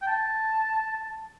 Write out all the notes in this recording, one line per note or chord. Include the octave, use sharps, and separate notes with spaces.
G5
A5